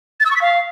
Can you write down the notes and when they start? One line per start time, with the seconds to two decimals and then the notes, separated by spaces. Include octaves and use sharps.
0.20 A6
0.25 E6
0.31 C#6
0.36 B6
0.41 F5